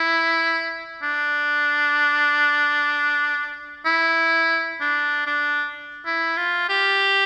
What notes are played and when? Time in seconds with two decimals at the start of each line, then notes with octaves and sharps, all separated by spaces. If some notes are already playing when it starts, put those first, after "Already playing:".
Already playing: E4
1.03 D4
3.86 E4
4.80 D4
5.27 D4
6.06 E4
6.37 F4
6.69 G4